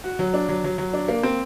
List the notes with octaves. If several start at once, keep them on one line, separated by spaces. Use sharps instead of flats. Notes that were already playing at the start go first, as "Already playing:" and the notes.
F#4
F#3
D4
F#3
F#3
F#3
D4
A#3
C4